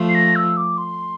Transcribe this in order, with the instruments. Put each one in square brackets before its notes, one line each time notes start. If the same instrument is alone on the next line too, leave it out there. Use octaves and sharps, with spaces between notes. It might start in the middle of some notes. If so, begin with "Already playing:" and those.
Already playing: [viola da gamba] F3 A3
[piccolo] C7
A#6
E6
D6
C6